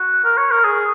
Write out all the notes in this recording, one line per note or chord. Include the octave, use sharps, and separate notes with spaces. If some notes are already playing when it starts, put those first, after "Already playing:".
Already playing: F#4
A#4
C#5
A#4
G#4